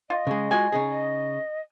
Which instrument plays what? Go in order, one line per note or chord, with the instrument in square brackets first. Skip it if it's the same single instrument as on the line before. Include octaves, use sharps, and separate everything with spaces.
[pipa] F4 [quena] D#5
[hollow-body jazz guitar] C#3 G#3
[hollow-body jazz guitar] G#3 F4 F#4 [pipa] G#5
[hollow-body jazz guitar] C#3 D#4 G#4
[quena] D#5